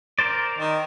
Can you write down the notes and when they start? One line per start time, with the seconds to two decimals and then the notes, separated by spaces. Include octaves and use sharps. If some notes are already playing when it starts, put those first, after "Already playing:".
0.19 A#4 C5 D5
0.58 D#3